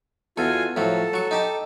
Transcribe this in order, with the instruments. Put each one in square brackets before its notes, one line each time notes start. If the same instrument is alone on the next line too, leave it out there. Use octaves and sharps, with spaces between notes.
[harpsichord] E2 A4 [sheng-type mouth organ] F4 F#4 G#5
[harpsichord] A2 F3 F#3 [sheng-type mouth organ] A4
[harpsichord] F#3 C#6
D#4 G4 A5